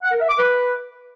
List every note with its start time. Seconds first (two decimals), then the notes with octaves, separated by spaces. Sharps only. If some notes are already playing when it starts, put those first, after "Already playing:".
0.03 F#5
0.11 A#4
0.20 E5
0.29 D6
0.38 B4